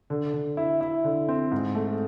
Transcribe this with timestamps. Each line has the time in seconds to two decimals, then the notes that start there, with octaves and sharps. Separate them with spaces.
0.10 D3
0.33 D3
0.57 E4
0.81 E4
1.04 D3
1.29 C4
1.52 G#2
1.75 A3